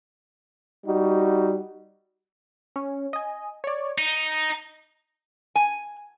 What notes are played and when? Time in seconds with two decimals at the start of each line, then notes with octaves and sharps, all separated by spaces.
0.86 G3 D#4 F#4
2.76 C#4
3.13 D#5 G#5
3.64 C#5 D5
3.98 D#4 C#7
5.56 G#5